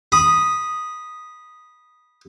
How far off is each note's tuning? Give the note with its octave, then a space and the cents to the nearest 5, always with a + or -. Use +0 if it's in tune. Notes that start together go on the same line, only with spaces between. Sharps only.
B5 -15 D#6 +0